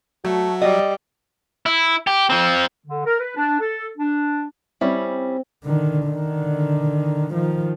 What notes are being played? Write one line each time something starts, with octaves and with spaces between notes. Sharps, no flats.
F#3 A3 F#4 E5
G3 D#5
E4
G4
F3 C4
D3
A#4
B4
D4
A4
D4
G3 C4 C#4 E4
D3 D#3
D3 D#3
D#3 F3